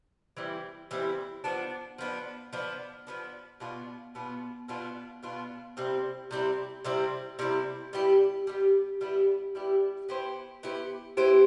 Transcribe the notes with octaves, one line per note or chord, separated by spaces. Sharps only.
E3 G3 C4 E4
E3 G3 C4 E4
F3 B3 D4
F3 B3 D4
F3 B3 D4
F3 B3 D4
B2 B3 D4 F4
B2 B3 D4 F4
B2 B3 D4 F4
B2 B3 D4 F4
C3 G3 C4 E4
C3 G3 C4 E4
C3 G3 C4 E4
C3 G3 C4 E4
G3 B3 E4 G4
G3 B3 E4 G4
G3 B3 E4 G4
G3 B3 E4 G4
B3 E4 G4 C5
B3 E4 G4 C5
B3 E4 G4 C5